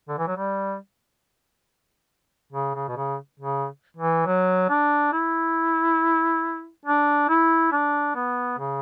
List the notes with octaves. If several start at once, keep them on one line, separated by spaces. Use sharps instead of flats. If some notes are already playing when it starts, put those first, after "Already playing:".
D3
E3
F#3
G3
C#3
C#3
B2
C#3
C#3
E3
F#3
D4
E4
D4
E4
D4
B3
C#3